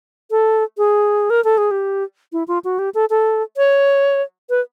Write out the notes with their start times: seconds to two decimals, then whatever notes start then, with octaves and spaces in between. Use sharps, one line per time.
0.31 A4
0.78 G#4
1.30 A#4
1.44 A4
1.58 G#4
1.71 G4
2.33 E4
2.48 F4
2.64 F#4
2.79 G4
2.94 A4
3.10 A4
3.57 C#5
4.50 B4